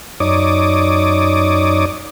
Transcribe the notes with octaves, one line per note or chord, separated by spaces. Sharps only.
F#2 D#4 C#5 D5 D6 D#6